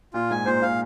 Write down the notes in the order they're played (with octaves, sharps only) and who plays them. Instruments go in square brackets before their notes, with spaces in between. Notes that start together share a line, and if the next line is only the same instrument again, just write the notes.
[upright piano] A#2 [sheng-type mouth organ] F4
[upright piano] G#2 [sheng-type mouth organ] G#5
[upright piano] A#2 [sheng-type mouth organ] C5
[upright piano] A#2 [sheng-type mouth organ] F5